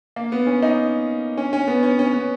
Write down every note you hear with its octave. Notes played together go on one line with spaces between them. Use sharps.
A#3
B3
C#4
D#4
C#4
C#4
B3
C#4
C#4
B3